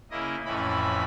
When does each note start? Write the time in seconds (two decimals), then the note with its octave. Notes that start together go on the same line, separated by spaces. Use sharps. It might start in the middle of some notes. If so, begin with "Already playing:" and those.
0.11 C#3 A#3 E4 D#5
0.45 F2 A2 E3 C#4 E4 B5